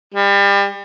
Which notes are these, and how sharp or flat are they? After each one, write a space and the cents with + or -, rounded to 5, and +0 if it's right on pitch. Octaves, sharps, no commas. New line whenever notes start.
G3 +30